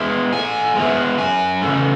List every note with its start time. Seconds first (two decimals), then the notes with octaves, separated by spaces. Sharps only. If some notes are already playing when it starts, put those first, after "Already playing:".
Already playing: G#3 B3 E4
0.33 A2 G#5
0.75 G#3 B3 E4
1.18 F#2 G#5
1.61 C#3 E3 A3 C#4